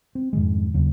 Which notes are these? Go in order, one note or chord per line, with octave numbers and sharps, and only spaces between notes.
C4
F2 G#2 D#3 G#3
D#2 C#3 F#3 A#3